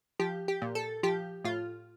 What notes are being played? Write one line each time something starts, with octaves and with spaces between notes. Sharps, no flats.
F3 G4
G4
A#2
A4
F3 G4
A2 F4